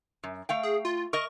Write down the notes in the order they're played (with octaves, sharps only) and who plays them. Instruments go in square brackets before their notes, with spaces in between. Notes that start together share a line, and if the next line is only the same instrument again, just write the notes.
[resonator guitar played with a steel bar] F#2
A3 F5 G5
[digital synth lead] G#4
F4
[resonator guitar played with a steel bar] A#4 D#5 [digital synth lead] C#6